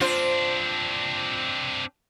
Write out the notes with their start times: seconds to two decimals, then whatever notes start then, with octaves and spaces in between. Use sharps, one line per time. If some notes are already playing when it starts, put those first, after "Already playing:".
0.01 C4 D4 F4 C5